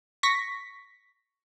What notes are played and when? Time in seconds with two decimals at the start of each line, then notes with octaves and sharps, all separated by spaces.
0.23 C#6 A#6 B6